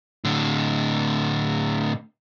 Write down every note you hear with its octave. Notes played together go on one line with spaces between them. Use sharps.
A2 D3